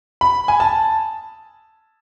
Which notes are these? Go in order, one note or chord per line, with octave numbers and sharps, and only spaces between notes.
B5
G#5
A5